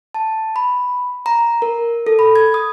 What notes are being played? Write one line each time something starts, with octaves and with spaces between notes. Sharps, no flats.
A5
B5
A#5
A#4
A4
B5
G#6
D#6